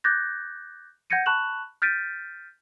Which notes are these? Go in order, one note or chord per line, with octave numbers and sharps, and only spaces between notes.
D6 F#6 G6 A6 A#6
F#5 G6 G#6 A#6 C#7 D#7
A5 B5 C#6 F#6 E7 F#7
F6 G6 A6 B6 D7 D#7